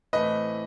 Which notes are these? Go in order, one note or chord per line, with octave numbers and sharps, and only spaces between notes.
A2 E3 A3 C4 B4 D#5